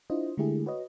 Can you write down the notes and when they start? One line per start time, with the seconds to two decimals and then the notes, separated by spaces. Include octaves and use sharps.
0.10 D4 E4 F4 C5 D#5
0.38 D3 G#3 A3 E4 G4 G#4
0.66 F#4 B4 C#5 D#5